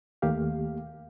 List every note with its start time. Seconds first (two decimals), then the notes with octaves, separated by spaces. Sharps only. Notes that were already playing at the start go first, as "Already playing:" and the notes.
0.22 D#2 A3 A#3 G4 F5